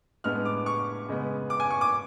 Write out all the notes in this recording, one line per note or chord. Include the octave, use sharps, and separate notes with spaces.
A2 G#3 B3 D4 F6
D6
C#6
C#3 G#3 B3
D6
G#5
C#6
D6